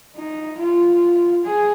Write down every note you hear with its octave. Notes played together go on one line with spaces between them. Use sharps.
D#4
F4
G#4